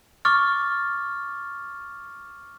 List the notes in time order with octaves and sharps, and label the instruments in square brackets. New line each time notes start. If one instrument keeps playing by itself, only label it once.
[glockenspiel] C#6 D6 F6 A6